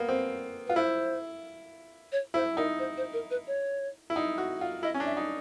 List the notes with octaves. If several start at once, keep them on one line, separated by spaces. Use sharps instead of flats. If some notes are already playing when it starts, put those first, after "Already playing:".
Already playing: A#3 B3
C4
F4 B4
E4 C5
C#5
E4 C5
D#4 A#4
C5
C5
A#4
B4
C#5
E4
D#4
F#4
F4
E4 D#5
C#4
D4
E5
D#4